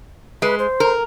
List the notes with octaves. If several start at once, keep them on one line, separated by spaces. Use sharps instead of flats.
G#3 B4
C5
A#4